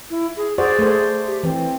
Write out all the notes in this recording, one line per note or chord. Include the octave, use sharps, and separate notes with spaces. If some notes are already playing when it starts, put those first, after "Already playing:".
E4
G#4
F#4 G#4 C5 D5
A3 C5
G4
E3 C4